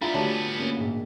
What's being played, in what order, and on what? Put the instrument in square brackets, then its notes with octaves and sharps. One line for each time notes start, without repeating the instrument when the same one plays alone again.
[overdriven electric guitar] G3 B3 [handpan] D4 F4 [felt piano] E5 A#5 B5
[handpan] D3 A3 F#4 [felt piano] G4 C#5 A5
[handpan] A#3 [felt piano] C#4
[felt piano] A#1 G#2